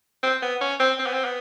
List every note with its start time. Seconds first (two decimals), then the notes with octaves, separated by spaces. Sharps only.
0.23 C4
0.42 B3
0.61 C#4
0.80 C4
0.99 C4
1.06 B3
1.13 C4
1.25 B3